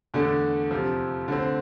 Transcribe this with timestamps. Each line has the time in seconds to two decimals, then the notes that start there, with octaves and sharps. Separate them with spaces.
0.14 E2 D3 A3 D4
0.71 F2 C3 F3
1.28 D3 A3 C4